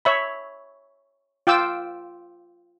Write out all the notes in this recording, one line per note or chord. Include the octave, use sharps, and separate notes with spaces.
C#5 E5 B5
F4 G5 D6 E6